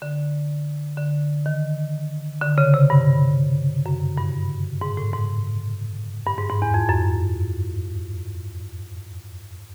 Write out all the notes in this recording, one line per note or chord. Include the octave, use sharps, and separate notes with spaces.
D3
D3
D#3
D3
C#3
C3
G2
F#2
G2
G#2
A2
G#2
G2
G#2
G#2
E2
F2
F#2